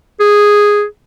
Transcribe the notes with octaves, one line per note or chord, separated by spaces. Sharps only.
G#4